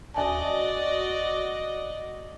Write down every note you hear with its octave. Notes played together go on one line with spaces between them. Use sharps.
D#2 F#4 D5 D#5 G#5 A5